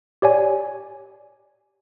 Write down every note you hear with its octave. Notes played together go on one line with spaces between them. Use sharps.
G4 C#5 D5 G#5